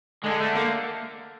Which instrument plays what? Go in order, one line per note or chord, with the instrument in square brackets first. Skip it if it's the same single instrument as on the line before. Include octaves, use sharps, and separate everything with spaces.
[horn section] D3 [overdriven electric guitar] G#3
[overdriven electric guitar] A3
A#3